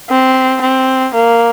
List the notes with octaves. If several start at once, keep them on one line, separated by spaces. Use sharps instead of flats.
C4
C4
A#3